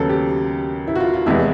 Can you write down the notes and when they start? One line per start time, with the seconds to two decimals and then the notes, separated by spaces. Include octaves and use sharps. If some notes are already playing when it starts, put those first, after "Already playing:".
Already playing: D#2 C#3 F#3 B3 A4
0.09 G4
0.87 E4
0.96 F#4
1.00 F4
1.14 F4
1.26 F1 E2 C3 E3 G#3 E4